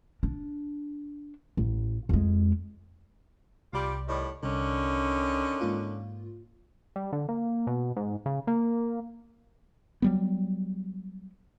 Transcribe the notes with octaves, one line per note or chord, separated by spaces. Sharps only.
D4
A1
F2 G#3
C2 G3 F4 G4 D5
A2 D#3 G3
C2 D3 D#3 C#4
G#2 A#3 F4
G3
D3
A#3
B2
G#2
C#3
A#3
F#3 G3 B3